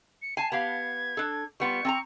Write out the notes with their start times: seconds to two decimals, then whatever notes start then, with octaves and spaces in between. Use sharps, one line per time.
0.22 C#7
0.37 G#5 A5 C7
0.52 B3 G4 F5 G#6
1.17 D4 A4
1.60 G3 B3 F4 C#6
1.85 C4 A5 A#5